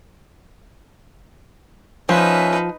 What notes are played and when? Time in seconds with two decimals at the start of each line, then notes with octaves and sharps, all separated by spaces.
2.09 F3 C#4 D#4 B4 E5